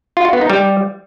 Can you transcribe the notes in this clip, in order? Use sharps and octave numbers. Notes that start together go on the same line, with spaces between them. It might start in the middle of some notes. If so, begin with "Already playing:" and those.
F4
F#4
B3
D#4
G3